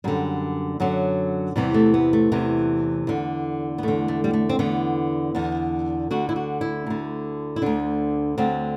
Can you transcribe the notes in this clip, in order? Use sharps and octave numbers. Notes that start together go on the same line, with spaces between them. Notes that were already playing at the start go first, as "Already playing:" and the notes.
F#2 D3 G3
F#2 D3 F#3
E2 C3 E3 G3
A3
B3
A3
E2 C3 E3
E2 D3
B3
E2 D3 A3
A3
G3
A3
C4
E2 D3 B3
E2 D3
D2 D3 F#4
E4
F#4
E4
D2 D3
E4
D2 D3 D4
D2 D3 C4